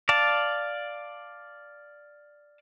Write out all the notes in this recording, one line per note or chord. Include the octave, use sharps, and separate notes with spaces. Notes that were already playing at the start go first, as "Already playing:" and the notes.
D5 F5 A5